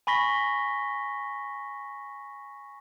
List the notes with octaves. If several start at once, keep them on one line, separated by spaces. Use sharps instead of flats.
G#5 B5 C#6 A#6 B6 G7